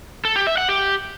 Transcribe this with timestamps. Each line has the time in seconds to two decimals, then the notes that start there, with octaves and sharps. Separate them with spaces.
0.25 A4
0.36 G4
0.47 E5
0.58 F#5
0.69 G4